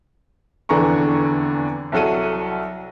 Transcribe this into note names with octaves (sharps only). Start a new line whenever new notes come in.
F1 E2 D3 E3 A#5 C#6
C2 F#3 A4 F#5 D#7